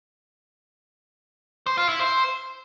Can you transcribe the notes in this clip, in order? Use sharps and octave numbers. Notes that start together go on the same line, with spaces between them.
C5
F4
E4
C5